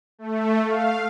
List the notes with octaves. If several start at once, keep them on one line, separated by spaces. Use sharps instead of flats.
A3
F5